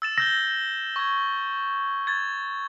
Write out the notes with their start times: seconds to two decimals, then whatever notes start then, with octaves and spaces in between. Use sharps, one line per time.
0.02 E6 A6 E7
0.18 E6 G6 A#6 G7
0.96 C#6 G#6
2.07 G#6 A6